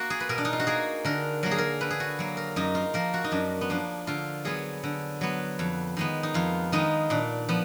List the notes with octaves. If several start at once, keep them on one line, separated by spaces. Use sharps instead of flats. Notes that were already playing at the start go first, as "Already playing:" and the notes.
Already playing: A#3 F#4
G#4
B4
B2 A#4
D4
D#4
F4
F#4
A#3 G#4
D3 A#4
F#3 A#3 A#4
G#4
A#4
D3 B4
G#4
F#4
F#3 A#3
A#4
F#2 D#4
F4
F3 A#3 A#4
F#4
D#4
F#2 D4
B3
F3 A#3 D4
D3 F4
F#3 B3 G#4
D3
F#3 B3
F2
D#3 G#3 B3
D#4
F2 F4
D#3 G#3 B3 D#4
A#2 D4
F3 B3